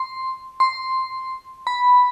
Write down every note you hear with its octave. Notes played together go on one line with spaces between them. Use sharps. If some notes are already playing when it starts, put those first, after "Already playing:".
Already playing: C6
C6
B5